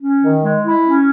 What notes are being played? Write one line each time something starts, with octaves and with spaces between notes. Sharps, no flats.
C#4
D#3
G#3
E4
C#4